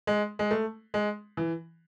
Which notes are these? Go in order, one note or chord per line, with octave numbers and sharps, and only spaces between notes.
G#3
G#3
A3
G#3
E3